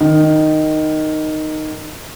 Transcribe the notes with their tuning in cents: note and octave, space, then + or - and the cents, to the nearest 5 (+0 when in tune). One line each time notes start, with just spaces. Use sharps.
D#3 -5